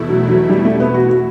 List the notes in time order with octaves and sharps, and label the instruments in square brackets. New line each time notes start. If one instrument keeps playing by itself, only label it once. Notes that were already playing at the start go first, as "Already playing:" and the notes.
Already playing: [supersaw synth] E2 B2 A3 E4
[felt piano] F#3
F#3
G3
A3
B3
F#4
F#4